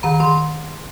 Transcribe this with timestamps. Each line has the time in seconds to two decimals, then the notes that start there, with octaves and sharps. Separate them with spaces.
0.03 D#3 A#5
0.20 D#3 C6